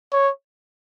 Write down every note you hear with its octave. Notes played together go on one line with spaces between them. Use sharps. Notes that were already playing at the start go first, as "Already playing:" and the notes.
C#5